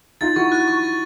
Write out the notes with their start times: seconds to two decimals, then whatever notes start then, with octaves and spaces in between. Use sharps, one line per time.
0.21 D#4 F4 A6
0.36 E4 F#4 C#6
0.52 F#6
0.68 C#6
0.83 A6